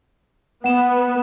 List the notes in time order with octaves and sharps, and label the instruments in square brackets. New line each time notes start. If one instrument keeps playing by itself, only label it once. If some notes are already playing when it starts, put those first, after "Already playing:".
[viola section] B3 [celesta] F#5 E7